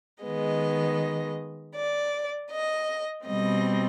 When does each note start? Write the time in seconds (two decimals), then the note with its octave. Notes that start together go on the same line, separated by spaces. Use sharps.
0.23 D#3 G#3 B3 D#5
1.74 D5
2.50 D#5
3.26 B2 G3 C4 D#5